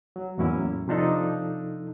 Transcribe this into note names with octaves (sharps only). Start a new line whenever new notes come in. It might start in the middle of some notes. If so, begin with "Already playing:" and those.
F#3
E2 A2 F#3 A#3 C#4 E4
C3 F3 D4 D#4 A4